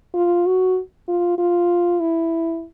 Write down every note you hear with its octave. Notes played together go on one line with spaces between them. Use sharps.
F4
F#4
F4
F4
E4